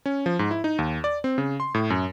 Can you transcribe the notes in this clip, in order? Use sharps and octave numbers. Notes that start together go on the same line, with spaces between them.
C#4
F3
G#2
E4
D#4
D#2
D5
C4
C#3
C6
A2
F#2